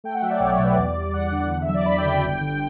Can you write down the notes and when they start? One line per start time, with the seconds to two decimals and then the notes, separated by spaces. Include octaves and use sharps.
0.04 A3 G5
0.14 F#5
0.22 F#3 E5
0.31 D5
0.40 B1 C#5
0.52 C#5
0.59 B2
0.64 B4
0.76 E2 D5
0.95 G3
1.14 E2 F#5
1.31 D3
1.50 E2 F#5
1.62 E5
1.68 F#3
1.74 D5
1.86 E2 B5
1.98 G5
2.05 C#3
2.11 G5
2.23 G1
2.41 D3